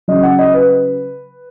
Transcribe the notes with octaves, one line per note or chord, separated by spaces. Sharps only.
C#3 F#3 D#5
F#5
D#5
B4